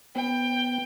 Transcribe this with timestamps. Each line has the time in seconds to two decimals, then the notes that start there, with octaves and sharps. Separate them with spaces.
0.16 B3 G5